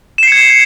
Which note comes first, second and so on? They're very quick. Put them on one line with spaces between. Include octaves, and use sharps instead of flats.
E7 C7 C#7 G#6